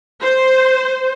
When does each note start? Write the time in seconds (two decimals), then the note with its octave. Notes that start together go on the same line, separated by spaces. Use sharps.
0.22 C5